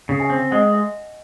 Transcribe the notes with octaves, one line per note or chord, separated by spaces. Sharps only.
C#3
E5 G#5
C4
G#3 D#5 F#5
E5